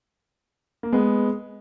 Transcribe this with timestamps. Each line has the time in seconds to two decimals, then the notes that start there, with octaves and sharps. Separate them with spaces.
0.83 A#3
0.93 G#3 B3